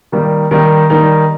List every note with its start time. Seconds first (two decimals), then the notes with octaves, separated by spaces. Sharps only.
0.12 D#3 G3 A#3 D#4
0.51 D#3 G3 A#3 D#4
0.90 D#3 G3 A#3 D#4